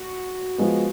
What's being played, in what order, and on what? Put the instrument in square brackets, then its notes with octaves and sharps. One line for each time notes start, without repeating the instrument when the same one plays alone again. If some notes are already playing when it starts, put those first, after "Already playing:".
Already playing: [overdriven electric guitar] F#4
[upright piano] F3 G#3 B3